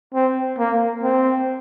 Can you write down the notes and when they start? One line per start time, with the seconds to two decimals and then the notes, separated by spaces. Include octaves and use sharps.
0.14 C4
0.58 A#3
1.03 C4